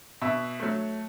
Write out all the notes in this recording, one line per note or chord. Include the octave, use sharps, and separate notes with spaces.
B2 E5
F#3 A3